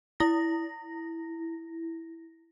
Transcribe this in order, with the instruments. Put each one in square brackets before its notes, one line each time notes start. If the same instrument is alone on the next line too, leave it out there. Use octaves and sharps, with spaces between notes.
[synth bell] E4 A#6